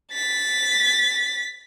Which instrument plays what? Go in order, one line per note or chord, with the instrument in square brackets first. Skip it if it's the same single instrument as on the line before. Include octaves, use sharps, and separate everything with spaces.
[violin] A6 B6